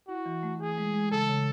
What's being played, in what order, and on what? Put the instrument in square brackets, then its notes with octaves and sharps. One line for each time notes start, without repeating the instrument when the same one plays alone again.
[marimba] E4 [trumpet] F#4
[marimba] E3
A3
[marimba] E3 [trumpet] G#4
[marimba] G#3
G#3
[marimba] C#3 [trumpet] A4
[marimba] C#3